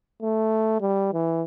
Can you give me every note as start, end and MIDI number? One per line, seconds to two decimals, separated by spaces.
0.22 0.78 57
0.81 1.13 55
1.13 1.43 52